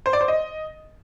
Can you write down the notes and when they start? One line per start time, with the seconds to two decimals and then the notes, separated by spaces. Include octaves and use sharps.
0.06 C5
0.13 D5
0.21 C5
0.28 D#5